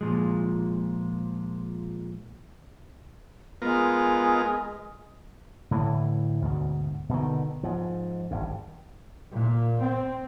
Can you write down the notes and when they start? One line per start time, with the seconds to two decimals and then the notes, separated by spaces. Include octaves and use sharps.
0.01 A#2 F3 G#3
3.62 G#3 B3 F4 A#4
5.71 A2 D3 E3
6.42 D2 G#2 B2
7.09 B2 D3 D#3
7.63 G#2 F3
8.31 G#1 G2
9.33 A#2
9.80 C4